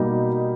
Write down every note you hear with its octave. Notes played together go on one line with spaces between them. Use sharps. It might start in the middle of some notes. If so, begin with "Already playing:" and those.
Already playing: B2 G3 A#3 D#4 G4